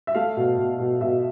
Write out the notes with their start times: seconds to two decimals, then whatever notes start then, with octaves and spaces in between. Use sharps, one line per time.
0.07 E5
0.15 A3 F5
0.37 B2
0.58 B2
0.79 B2
1.01 B2 E5